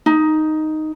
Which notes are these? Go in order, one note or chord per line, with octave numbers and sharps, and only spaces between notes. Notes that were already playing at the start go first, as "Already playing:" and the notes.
D#4